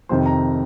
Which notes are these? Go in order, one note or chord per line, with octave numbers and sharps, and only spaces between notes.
F2 C3 D#3 C5
A#5